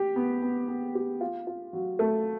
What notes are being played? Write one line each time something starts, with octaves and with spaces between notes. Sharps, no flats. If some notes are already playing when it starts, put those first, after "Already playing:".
Already playing: G4
B3
B3
B3
G4
F4
F4
F#3
A3